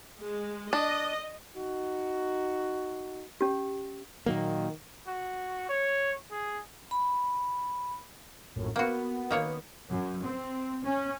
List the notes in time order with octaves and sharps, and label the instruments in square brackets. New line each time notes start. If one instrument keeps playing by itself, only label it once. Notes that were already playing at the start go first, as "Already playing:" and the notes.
[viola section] G#3
[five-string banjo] D4 [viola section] D#5
[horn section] D#4 F#4
[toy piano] C#4 G4
[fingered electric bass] A#2 F#3 A#3 [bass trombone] D#3
[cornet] F#4
C#5
G#4
[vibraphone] B5
[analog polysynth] A#1 F#2 A2
[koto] A#3 F#4 [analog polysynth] B3
[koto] D#3 A#3 C#5
[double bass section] F#2
C4
C#4